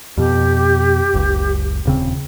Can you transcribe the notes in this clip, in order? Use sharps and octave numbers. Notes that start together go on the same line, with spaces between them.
F2 B2 G4
F#1 C#2
D#1 C#3 C4